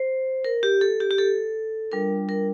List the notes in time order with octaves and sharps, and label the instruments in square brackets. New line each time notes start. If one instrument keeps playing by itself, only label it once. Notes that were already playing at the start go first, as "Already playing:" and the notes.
Already playing: [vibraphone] C5
A#4
G4
A4
G4
G4
A4
G3 D4 F4 A#4
A#4